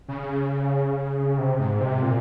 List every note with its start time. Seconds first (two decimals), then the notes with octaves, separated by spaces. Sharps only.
0.08 C#3
1.38 C3
1.59 G#2
1.81 C3
2.02 A#2